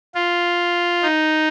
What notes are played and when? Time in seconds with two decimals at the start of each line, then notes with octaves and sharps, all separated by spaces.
0.15 F4
1.03 D#4